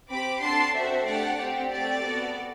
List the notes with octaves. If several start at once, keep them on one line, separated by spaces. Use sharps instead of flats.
C4 G4 B5 D6
D4 F#4 A4 A5 C6
C4 F#4 A4 C5 E5
A3 D4 G4 D5 F#5
C4 G4
A3 C4 G4 D5
B3 F#4 A4